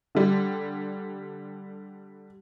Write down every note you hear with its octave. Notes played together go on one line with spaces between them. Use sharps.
D3 G3